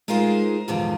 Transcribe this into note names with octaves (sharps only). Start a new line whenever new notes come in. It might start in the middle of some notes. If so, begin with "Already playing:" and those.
G#3 D#4 F4 G#4 A#4 C5
E2 G#2 D3 D#3 F3